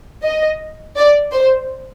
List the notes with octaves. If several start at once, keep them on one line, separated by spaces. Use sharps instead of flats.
D#5
D5
C5